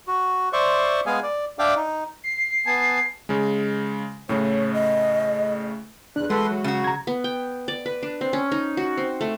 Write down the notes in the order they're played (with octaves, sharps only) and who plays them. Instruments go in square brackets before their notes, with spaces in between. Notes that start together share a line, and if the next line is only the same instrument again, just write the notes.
[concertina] F#4
C5 D5 E5 C6 C#6
G#3 B3 G#4 F5 G#5
D5
D4 D5 E5 F5 G5 D6
D#4
[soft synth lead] C7
[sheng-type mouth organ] B3 G#5 A5
[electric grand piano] C#3 G#3
[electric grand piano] A2 C#3 A3 [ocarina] C#5
[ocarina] D#5
[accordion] E2 F#6 [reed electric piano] D4
[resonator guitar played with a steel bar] E2 F#4 [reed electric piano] G#3 [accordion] A4 B4 C6
[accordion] F#3
[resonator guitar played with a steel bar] C#3 F#4
[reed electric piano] A#5 G#6
[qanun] B3
G5
D5
B4
D4
C4
C#4
D#4
F#4
C4
A3